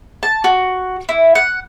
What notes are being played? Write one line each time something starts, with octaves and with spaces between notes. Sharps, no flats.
A5
F#4
E4
F#5